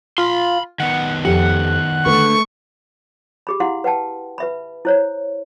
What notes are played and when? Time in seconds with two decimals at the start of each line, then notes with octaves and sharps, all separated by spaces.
0.18 F4 B5 C6
0.80 D#3 B3 F#5
1.25 F2 G4 F#5
2.06 D3 A3 B4 C#6
3.47 G4 G#4 B5
3.60 E4 G4 F5 F#5 C6
3.84 B4 F#5 G5 A5
4.38 B4 E5 B5
4.85 E4 C5 C#5